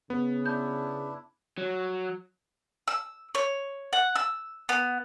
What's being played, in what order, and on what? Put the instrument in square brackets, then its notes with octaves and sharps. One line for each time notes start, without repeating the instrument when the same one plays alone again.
[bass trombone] C#3 [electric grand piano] B3
[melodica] D4 E4 [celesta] G6
[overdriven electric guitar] F#3
[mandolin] E6
C#5
F#5
E6
B3